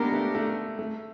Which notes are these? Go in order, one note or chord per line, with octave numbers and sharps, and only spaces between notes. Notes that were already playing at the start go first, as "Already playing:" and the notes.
Already playing: G#3 A#3 B3 D4 G4 A#4
A3
A3
A3